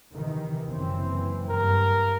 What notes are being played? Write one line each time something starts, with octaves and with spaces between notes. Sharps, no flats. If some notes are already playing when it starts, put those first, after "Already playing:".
C3 D#3 E3
F#1 E3 C4
G2 A#4